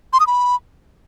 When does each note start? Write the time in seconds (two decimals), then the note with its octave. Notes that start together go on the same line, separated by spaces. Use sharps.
0.13 C6
0.20 D#6
0.27 B5